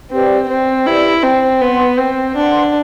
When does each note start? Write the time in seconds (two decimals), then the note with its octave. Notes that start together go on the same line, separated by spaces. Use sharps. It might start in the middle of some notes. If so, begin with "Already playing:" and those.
0.11 C4 G4 B4 D5
0.49 C4
0.86 E4 G4 B4 D5
1.23 C4
1.61 B3 B4 F#5 C6
1.97 C4
2.35 D4 B4 F#5 C6